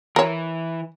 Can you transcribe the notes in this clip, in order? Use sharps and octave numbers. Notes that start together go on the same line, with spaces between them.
E3 A#4 C#5